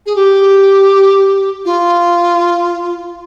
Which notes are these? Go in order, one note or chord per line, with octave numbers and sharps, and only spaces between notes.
G#4
G4
F4